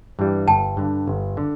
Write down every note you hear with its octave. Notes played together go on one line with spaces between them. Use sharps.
G2 E3 G3
G1 G5 A5
G2 D3
G1
D3